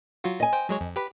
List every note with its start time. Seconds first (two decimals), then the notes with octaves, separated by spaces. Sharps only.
0.24 F#3 F4 F#4
0.40 D#5 G#5
0.53 C5 G5
0.69 F#3 G#3 C#5
0.81 F2
0.96 G4 B4 B5